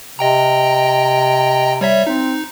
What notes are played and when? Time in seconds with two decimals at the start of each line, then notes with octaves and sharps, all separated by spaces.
0.19 C3 D#5 G5 A#5
1.81 G3 C#5 E5
2.07 C4 D#4